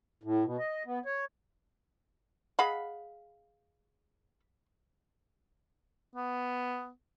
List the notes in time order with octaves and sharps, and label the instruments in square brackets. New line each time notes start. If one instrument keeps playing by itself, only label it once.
[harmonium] A2
B2
D#5
B3
C#5
[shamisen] G#4 D#5 F#5 [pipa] F5 B5
[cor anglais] B3